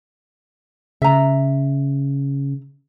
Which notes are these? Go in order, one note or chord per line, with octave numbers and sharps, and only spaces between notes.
C#3 E5 A#5